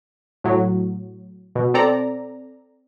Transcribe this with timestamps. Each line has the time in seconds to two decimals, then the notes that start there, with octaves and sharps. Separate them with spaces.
0.44 A2 F#3
1.55 B2
1.74 C4 A4 D5 A#5